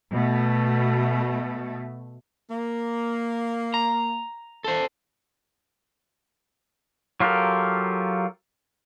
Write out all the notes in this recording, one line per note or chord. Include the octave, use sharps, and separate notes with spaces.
B2 A3
A#3
A#5
A4 C5
F#3 F4 G4 A4 A#4